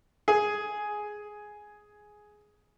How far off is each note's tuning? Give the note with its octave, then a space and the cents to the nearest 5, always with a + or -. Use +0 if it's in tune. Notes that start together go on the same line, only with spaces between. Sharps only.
G#4 +5